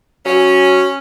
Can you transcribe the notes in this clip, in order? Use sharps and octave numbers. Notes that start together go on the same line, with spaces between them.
F#3 C#4